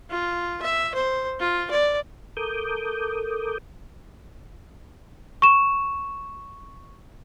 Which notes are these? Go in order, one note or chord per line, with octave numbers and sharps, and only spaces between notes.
F4
E5
C5
F4
D5
A4 A#4 D6 D#6 G6
C#6 E7